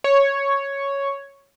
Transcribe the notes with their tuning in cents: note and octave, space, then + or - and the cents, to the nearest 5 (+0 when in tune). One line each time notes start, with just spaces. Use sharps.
C#5 +0